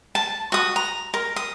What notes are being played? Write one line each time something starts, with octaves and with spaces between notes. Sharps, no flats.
A5
F#4 D#6
A#5
A#4
D#6